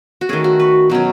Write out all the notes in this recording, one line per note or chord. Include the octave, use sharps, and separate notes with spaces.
F#4
D#3 A3 C#4 G#4
F#4
B4
B2 F#3 C#4